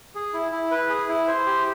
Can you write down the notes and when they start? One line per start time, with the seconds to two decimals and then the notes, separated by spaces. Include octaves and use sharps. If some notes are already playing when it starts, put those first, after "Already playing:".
0.15 G#4
0.34 E4
0.52 E4
0.71 B4
0.90 G#4
1.09 E4
1.28 C5
1.46 G4